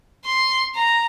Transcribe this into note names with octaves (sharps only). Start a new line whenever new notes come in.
C6
A#5